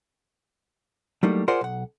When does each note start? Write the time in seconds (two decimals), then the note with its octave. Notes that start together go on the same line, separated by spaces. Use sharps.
1.23 F#3 G3 A3 A#3 D#4 E4
1.48 F4 G#4 A#4 C5 D5 F#5
1.61 B1 F#5